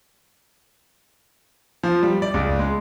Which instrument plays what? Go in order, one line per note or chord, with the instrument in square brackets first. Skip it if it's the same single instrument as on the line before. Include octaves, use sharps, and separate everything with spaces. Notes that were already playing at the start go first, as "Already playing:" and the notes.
[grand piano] F3
G3
D5
C#2
G#3